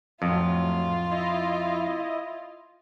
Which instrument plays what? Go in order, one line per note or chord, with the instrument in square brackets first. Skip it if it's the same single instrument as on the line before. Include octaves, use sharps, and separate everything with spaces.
[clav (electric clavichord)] F2 [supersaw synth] A2 F#3 [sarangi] F4
[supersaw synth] E4 D#5